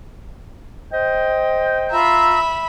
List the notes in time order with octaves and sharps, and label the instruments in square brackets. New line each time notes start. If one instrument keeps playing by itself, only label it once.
[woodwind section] C5 D#5 G5
[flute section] F4 A#5 E6 [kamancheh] E5 B5